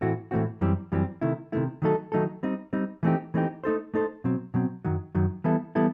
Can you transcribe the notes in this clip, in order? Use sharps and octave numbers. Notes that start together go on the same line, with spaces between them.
A2 E3 A3 C4 F#4
A2 E3 A3 C4 F#4
F#2 E3 G3 C4
F#2 E3 G3 C4
C3 D#3 A3 E4
C3 D#3 A3 E4
D#3 F#3 A3 D#4 A4
D#3 F#3 A3 D#4 A4
G3 C4 D#4
G3 C4 D#4
E3 A3 C4 D#4 G4
E3 A3 C4 D#4 G4
A3 D#4 A4 C5
A3 D#4 A4 C5
B2 F#3 C4
B2 F#3 C4
F#2 D#3 F#3
F#2 D#3 F#3
E3 G3 B3 E4 A4
E3 G3 B3 E4 A4